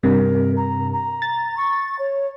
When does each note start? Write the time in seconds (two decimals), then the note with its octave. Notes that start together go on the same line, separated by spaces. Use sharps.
0.03 G2 C3 A#4
0.57 A#5
0.93 A#5
1.22 A6
1.57 C#6
1.99 C#5